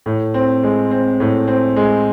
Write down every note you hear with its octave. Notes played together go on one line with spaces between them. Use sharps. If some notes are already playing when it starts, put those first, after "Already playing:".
A2
C4
G#3
C4
A2
C4
G#3